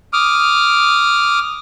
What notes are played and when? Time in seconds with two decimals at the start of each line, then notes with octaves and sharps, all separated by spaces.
0.13 D6 D#6 F6